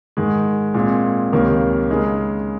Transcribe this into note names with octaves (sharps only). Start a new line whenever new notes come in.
G#2 D#3 G#3
A#2 G#3 C4
C#2 C3 D#3 A#3 C#4
C#3 G#3 D#4